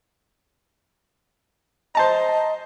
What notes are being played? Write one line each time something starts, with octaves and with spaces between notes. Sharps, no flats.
C5 D#5 A5 A#5